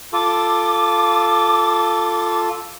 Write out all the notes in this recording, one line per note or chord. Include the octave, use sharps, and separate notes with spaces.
F4 A4 D6